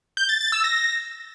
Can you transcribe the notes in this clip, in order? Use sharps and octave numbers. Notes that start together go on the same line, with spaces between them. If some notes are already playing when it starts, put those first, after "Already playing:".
G6
A6
A6
E6
A#6